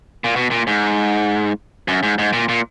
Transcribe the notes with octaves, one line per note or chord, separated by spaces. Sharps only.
A#2
B2
A#2
G#2
F#2
G#2
G#2
A#2
A#2